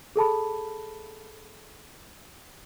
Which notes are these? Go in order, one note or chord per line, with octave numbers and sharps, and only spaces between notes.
G#4 A4 A5 B5